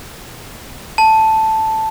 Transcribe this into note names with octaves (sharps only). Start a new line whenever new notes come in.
A5